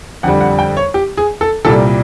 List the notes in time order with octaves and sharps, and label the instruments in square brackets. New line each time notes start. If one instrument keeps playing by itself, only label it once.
[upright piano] F2 D3 G3 F#5
F#5
G5
C#5
G4
G#4
A4
C2 A#2 G3 A4